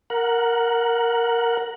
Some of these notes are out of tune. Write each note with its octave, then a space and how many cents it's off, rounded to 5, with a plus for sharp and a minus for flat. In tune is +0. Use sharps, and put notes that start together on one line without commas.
A#4 +0 F#5 +0